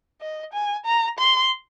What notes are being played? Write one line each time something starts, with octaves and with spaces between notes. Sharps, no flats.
D#5
G#5
A#5
C6